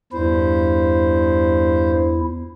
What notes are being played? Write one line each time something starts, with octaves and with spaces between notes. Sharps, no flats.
E2 G2 E4 C5